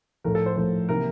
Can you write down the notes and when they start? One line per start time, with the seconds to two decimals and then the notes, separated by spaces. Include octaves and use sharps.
0.24 A2 F3 A3 A#4
0.35 A4
0.46 C5
0.56 A2 F3 A3 C5
0.89 C3 E3 A#3 E4 A#4